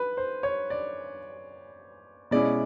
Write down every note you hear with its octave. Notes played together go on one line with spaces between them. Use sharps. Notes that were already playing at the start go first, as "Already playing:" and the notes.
Already playing: B4
C5
C#5
D5
B2 G#3 C#4 E4 D5